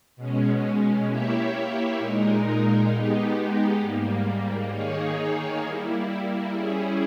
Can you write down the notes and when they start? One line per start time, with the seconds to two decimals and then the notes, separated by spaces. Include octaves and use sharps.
0.16 B2 G#3 C#4
1.07 A#3 E4 G4 C#5 E5
1.99 A#2 G#3 D#4 A#4
2.89 G#3 B3 D#4 G4
3.80 G#2 G3 A#3
4.71 D#3 A#3 D#4 G#4 C#5
5.61 G3 A#3 E4
6.52 G3 C#4 E4 G#4